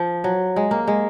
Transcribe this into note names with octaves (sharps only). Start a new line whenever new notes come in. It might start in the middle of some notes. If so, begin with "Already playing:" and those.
Already playing: F3
F#3
G#3
A#3
G#3